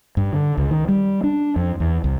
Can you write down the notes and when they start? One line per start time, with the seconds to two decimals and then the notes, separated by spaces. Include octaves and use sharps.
0.17 G2
0.33 D3
0.57 C#2
0.71 D#3
0.89 G3
1.24 D4
1.56 F2
1.80 E2
2.04 C2